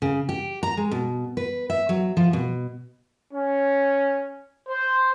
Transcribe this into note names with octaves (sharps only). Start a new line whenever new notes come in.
C#3
G4
A#5
G#3
B2
B4
E5
F#3
F3
B2
C#4
C5